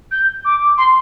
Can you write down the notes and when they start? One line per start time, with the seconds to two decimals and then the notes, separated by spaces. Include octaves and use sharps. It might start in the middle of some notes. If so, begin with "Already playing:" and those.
0.11 G6
0.45 D6
0.78 C6